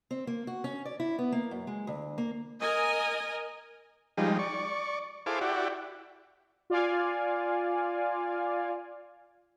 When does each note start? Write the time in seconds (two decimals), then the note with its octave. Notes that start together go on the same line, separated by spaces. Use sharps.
0.11 C4
0.27 A#3
0.47 F#4
0.64 C#4
0.85 D5
1.00 E4
1.19 B3
1.32 A#3
1.51 F#2
1.67 G#3
1.87 D2
2.18 A#3
2.61 A#4 D#5 G#5
4.17 F3 G3 G#3 D#4
4.39 D5 C#6
5.26 E4 G#4 A4 C5 F5 D6
5.41 E4 F#4 G4 D5
6.70 F4 D5 F5 G#5